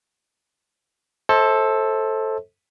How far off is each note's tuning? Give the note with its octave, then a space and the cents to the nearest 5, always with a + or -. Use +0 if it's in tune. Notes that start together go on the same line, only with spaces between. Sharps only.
A4 +0 C5 +25 D#5 +45